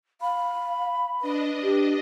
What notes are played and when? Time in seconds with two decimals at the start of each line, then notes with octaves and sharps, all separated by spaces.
0.21 F5 B5
1.21 D4 B4 D#5
1.63 G4